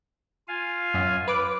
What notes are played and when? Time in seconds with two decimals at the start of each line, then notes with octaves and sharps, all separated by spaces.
0.48 F4 F5 G#5
0.94 F#2
1.28 B4 D6